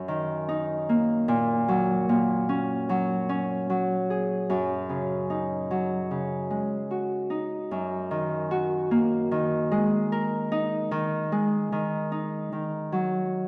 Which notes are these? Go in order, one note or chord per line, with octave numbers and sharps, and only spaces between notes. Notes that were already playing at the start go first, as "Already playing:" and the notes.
Already playing: F#2
D#3
D#4
A#3
A#2
F#3
A#2
C#4
F#3
C#4
F#3
G#4
F#2
C#3
D#4
F#3
C#3
G#3
F#4
D#4
F#2
D#3
F#4
A#3
D#3
G#3
A#4
D#4
D#3
G#3
D#3
D#4
D#3
F#3